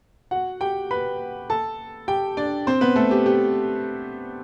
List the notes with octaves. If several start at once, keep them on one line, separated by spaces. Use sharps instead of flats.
F#4 F#5
G4 G5
B4 B5
A4 A5
G4 G5
D4 D5
C4 C5
B3 B4
A3 A4
G4
G4